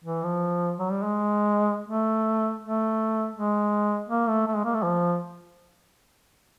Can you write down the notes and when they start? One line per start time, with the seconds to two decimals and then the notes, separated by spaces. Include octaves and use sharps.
0.04 E3
0.23 F3
0.78 F#3
0.91 G3
1.03 G#3
1.89 A3
2.63 A3
3.36 G#3
4.09 A#3
4.28 A3
4.47 A3
4.56 G#3
4.65 A#3
4.74 A3
4.83 F3